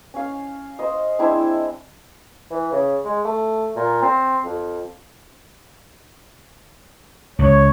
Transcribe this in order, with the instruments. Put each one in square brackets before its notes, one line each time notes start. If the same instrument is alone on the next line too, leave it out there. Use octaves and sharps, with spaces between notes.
[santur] C#4 F5
C5 D#5
G#3 C4 D4 E4
[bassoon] E3
C#3
G#3
A3
A#2
C4
F2
[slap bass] C#2 [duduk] C#5